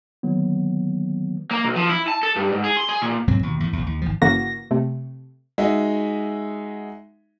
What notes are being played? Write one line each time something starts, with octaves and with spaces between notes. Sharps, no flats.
D3 D#3 F#3 A#3 B3
A#3
B1
F3
E4
A5
A4
G2
G#2
G#4
C6
G#4
A#2
B1 G#2 F#3 C4
D#2 B2
E2 A2
A#1 E2
D#2
G#1 D#3 F3
G1 C#3 E3 A#3 F#4 A#6
C3 A3
G#3 D#4 F#4 E5